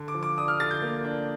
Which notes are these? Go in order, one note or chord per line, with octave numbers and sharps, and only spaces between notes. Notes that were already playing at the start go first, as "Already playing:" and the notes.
Already playing: D3
D6
F3
D6
D4 D#6
F6
D3 A6
G6
A#3
D4